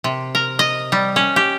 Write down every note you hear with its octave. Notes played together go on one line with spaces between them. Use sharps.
C3
A#4
D#5
G3
C#4
G4